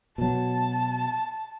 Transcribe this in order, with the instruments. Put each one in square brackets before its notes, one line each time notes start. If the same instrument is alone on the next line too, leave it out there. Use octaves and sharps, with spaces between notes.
[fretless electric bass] B2 F#3 [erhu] A5